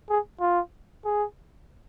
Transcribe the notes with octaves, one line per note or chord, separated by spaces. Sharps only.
G#4
F4
G#4